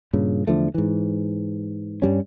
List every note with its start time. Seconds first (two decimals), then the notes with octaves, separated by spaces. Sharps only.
0.13 G2 A#2 C#3
0.47 E2 D3 F3 A3
0.74 G#2 E3
2.02 G2 G3 C#4